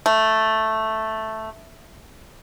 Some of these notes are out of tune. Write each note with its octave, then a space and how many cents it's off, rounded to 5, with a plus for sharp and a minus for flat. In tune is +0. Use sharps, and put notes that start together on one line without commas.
A3 +0